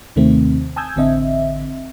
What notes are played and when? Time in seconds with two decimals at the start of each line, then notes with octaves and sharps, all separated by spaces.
0.16 D#2 C3 D#3 A3 C4
0.76 G#5 A5 D#6 E6 G6 G#6
0.96 A1 D3 C4 D#5 E5